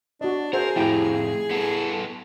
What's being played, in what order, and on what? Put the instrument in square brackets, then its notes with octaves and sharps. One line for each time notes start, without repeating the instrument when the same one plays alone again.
[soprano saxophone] D4 [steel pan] F#4 D#5
[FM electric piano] F#4 E5 [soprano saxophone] G#4 [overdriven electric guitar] A#4 [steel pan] C5
[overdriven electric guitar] F2 A2 [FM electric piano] E4 G4 [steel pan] G5 A#5
[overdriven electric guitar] B3 A4